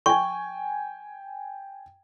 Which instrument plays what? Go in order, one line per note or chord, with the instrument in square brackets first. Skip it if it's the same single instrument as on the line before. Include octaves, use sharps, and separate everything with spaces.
[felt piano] G5 G#5 [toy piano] C#6